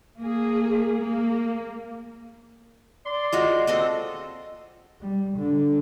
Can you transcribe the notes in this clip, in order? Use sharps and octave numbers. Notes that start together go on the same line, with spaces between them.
A#3 G#4
A#3
D5 C6
G#3 F4 F#4
C4 A4 D#5
G3
D3